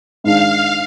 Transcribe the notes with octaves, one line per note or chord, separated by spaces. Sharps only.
G#2 D#3 G#3 D4 F5